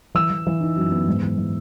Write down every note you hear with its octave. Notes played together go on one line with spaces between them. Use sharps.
E3 E6
E3
E3
D#4
F#2
B3
G#2
E3
E3